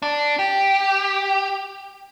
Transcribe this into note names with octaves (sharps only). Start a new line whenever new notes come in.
D4
G4